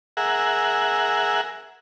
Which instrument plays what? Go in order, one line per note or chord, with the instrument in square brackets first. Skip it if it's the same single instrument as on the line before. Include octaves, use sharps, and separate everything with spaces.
[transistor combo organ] G#4 A#4 E5 F#5